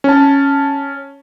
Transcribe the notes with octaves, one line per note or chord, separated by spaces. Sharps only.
C#4 A5